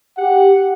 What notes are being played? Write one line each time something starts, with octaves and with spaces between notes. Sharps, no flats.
G4 F#5